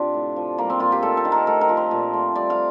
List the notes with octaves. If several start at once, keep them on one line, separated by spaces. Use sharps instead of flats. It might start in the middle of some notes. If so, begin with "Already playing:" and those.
Already playing: C3 D4 F4 G4 C5
A2
F3
G3 A#3
C4
A#2 F4
G4
A3 A4
A4
D#3
A#4
A3 A4
A#4
F3
C5
A#2
A3
G3 D5
F5